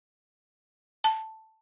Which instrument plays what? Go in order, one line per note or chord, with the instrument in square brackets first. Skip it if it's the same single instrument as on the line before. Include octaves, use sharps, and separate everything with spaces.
[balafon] A5